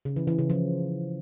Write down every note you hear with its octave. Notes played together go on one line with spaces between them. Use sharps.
C#3
E3
E3
C#3
F3